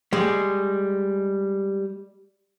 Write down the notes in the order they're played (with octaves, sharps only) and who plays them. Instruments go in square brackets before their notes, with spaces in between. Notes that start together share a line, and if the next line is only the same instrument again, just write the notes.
[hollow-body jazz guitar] G3 G#3